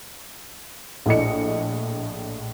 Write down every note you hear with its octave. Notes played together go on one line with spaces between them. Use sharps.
A#1 A2 D4 D#5 C#7